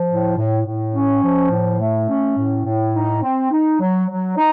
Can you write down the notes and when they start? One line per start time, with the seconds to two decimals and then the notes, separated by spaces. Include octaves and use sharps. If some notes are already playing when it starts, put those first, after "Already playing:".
Already playing: F3
0.09 A2
0.37 A2
0.65 A2
0.94 C#4
1.23 F3
1.50 A2
1.80 A3
2.08 C#4
2.37 A2
2.65 A2
2.94 D#4
3.22 C4
3.51 D#4
3.80 F#3
4.09 F#3
4.37 D#4